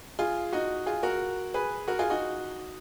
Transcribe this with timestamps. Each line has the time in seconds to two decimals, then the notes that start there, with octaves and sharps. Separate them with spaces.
0.19 F4 G#4
0.53 D#4 F#4
0.86 F4 G#4
1.03 F#4 A#4
1.54 G#4 B4
1.88 F#4 A#4
1.99 F4 G#4
2.10 D#4 F#4